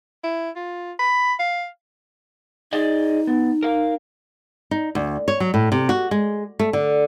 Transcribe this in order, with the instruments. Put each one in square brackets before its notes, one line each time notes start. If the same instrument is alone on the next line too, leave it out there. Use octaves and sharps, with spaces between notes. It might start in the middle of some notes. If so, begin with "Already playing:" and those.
[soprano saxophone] E4
F4
B5
F5
[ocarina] D#4 [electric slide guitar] G#4 D5 D#5
[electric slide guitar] B3
A#4 F5
[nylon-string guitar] D#4
D2
C#5
F#3
A2
C3
F#4
G#3
A3
D3